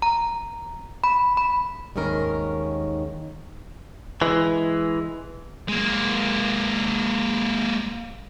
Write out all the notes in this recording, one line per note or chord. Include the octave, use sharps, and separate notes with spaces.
A#5
B5
B5
D#2 G#2 D#3 C#4 A#4
E3 G#3
G#3 A#3